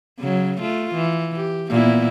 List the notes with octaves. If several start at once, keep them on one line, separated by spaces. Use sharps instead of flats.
C#3 F#3
A3 F4
E3
G4
A#2 B3 E4